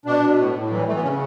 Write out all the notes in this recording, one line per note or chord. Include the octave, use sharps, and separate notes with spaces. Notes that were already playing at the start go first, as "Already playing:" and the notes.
B2 D4
B2
A2
A2
E3 F#3
G3
E3 A3
B3
C#3 C#4